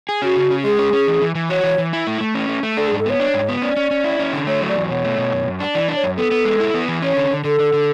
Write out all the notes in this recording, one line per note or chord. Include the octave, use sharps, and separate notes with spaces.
G#4
C#4 F#4
C#3
C#4
G#3 G#4
C#4
C#4
E3
E3
E3
F#4 C#5
E3
E3
E4
A3
A3
C#4
A3
A3
D4 A4
G#4
G#2
A4
B3 C#5
D4
G#2
B3
C#4 D5
C#4
C#4
E4
C#4
D3
A3 C#5
F#3
D5
E2
B2 C#5
A3
B2
F#2
F#2
D4
E3 D5
D4
C#5
F#2
B3 A4
B3
G#3
E4
B3
E3
C#4 C#5
D3
D3
D3 A4
D3
D3